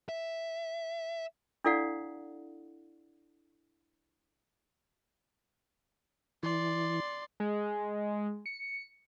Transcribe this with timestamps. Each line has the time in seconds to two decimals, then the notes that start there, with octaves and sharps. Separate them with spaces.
0.09 E5
1.64 D4 E4 A4 D5 F5 F#5
6.43 E3 D5 C6
7.40 G#3
8.46 C#7